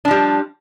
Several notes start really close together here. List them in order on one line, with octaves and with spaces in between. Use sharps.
D4 F3 G3